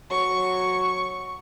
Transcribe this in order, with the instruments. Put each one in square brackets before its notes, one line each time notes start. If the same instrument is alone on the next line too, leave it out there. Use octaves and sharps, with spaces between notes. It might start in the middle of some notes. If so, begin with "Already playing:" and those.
[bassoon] F#3 [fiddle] C#6